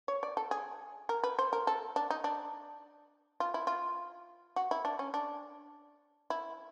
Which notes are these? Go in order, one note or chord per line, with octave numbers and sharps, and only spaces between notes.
C#5
D5
A4
G#4
A#4
B4
C5
A#4
A4
D4
D#4
D4
F4
E4
F4
F#4
E4
D4
C#4
D4
E4